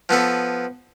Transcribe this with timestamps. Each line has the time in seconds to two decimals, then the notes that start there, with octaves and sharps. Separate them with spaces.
0.09 F3 B3 A4 B4